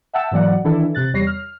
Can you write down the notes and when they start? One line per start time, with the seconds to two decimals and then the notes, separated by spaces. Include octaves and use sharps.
0.13 E5 F#5 G5 A5 E6
0.31 G#2 E3 F#3 A#3 D5 F#5
0.64 D#3 E3 D4 E4 A4
0.95 C3 F#6 A6
1.13 E2 G3 C#5 A#6 C7
1.27 F6